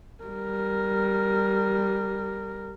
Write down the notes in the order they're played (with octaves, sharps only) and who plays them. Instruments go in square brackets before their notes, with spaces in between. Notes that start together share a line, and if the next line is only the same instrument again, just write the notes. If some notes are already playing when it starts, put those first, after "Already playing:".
[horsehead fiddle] G3 A#4